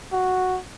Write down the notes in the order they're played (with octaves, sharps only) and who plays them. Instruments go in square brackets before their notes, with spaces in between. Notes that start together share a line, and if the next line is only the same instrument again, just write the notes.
[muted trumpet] F#4